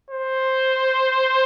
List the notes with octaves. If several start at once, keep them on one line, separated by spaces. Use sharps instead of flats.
C5